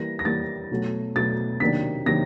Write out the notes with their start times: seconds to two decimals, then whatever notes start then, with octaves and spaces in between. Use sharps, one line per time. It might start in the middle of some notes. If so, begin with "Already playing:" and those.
Already playing: E3 G3 A#3 A#6
0.19 A#6
0.25 E3 G3 A#3 A6
0.71 B2 F#3 A3
1.16 B2 F#3 A3 A6
1.60 C3 D#3 F#3 A#3 D4 B6
2.06 C3 D#3 F#3 A#3 D4 A#6